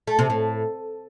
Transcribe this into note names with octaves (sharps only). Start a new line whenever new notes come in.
A3
C3
A2